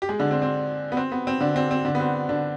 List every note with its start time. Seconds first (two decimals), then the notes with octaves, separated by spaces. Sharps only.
0.02 G4
0.09 G#3 G#4
0.19 D3 D4
0.31 C4
0.42 C4
0.92 B3
0.97 C4
1.12 B3
1.27 C4
1.41 D3 D4
1.56 C4
1.71 C4
1.85 D3 D4
1.95 B3
2.00 C4
2.29 D3 D4